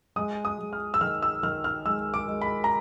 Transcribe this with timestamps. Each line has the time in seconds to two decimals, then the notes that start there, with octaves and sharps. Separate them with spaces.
0.16 G#3 D#6
0.45 D#6
0.59 G#3
0.73 F6
0.94 E6
1.01 D#3 F6
1.22 E6
1.43 D#3 F6
1.64 F6
1.86 G#3 E6
2.14 D6
2.28 G#3
2.41 B5
2.64 A#5